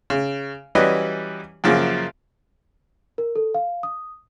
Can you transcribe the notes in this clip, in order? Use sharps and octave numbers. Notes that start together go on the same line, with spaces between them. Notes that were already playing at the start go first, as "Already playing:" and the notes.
C#3
E3 F#3 G3 C#4 B4 D#5
F#2 C#3 F3 A#3
A#4
A4
F5
D#6